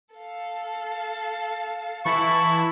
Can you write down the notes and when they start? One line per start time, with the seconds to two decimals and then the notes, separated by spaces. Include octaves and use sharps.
0.15 A4 F5
2.06 E3 E4 A5 B5 C#6